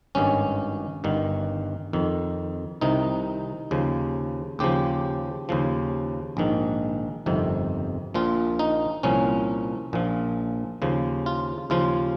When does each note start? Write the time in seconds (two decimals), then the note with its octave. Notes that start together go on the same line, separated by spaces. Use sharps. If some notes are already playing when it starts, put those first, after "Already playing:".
0.15 G#1 G2 D#3 C#4
1.04 G1 G2 D#3
1.93 F2 D#3
2.81 C2 C3 D#3 D#4
3.71 D#2 C#3 F3
4.59 D#2 C#3 F3 G4
5.49 D#2 C#3 F3
6.37 A#1 G#2 D#3
7.26 G1 F2 C3 D#3
8.14 A#1 A#2 F3 F4
8.59 D#4
9.03 C2 A#2 F3 C#4
9.93 A#1 A#2 F3
10.82 D#2 C#3 F3
11.26 F4
11.70 D#2 C#3 F3 F4